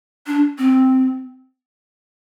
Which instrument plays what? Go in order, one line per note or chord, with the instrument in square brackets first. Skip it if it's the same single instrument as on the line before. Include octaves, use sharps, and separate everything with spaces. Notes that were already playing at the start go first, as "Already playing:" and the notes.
[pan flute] D4
C4